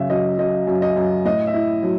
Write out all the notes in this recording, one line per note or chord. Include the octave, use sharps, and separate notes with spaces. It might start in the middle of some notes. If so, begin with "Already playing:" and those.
Already playing: F#2 C#3 E5
F#3 D#5
F#3 D#5
F#2
D#5
F#2
A2 D#5
E5
E4
F#3